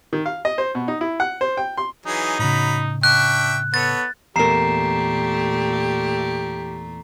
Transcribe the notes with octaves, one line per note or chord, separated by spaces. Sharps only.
D#3
F5
D#5
C5
B2
D#4
E4
F#5
C5
G5
C6
E3 F#3 D#4 G#4
A2 C#3 F#3 B5
D4 E5 G5 C#6 F#6
B3 A4 C#5 A6
E2 A#2 A3 G4 A#4 A#5 C7 E7